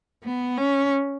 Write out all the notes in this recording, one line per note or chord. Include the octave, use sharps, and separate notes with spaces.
B3
C#4